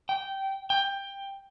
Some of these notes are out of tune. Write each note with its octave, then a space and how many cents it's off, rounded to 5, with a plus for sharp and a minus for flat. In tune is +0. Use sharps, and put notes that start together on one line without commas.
G5 -15
G5 +15